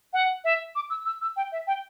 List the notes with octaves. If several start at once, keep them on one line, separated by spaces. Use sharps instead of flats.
F#5
E5
D6
E6
E6
E6
G5
E5
G5